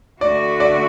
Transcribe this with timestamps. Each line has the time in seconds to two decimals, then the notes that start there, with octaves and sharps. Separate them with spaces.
0.21 D3 A3 F#4 D5
0.60 D5